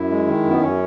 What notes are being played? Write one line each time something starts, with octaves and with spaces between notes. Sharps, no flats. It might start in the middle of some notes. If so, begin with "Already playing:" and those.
Already playing: F#2 E4
G#3
D#3
F#2
B3
F#2 C#4